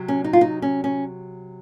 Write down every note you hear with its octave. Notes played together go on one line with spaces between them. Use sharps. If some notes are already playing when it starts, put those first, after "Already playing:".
Already playing: C3 F#3
C#4
D#4
F4
D#4
C#4
C#4